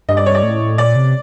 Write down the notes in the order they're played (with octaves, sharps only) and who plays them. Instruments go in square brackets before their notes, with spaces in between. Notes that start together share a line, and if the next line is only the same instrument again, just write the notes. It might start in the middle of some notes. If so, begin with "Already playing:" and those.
[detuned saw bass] G2 [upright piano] D#5
[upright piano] D5
C#5
D5
[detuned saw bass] A2
[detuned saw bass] A#2 [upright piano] D5
[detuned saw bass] C3